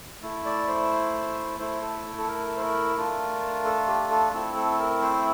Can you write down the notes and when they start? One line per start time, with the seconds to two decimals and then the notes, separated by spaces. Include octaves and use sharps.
0.22 A3 E4
0.45 D5
0.68 C5
1.59 A3 E4 C5
1.82 A4
2.18 A4
2.28 A#4
2.56 C5
2.62 A#4
2.96 A3 D4 F4
3.65 A4
3.87 G4
4.11 A4
4.33 A3 C4 E4 A4
4.56 A4
4.79 A#4
5.02 C5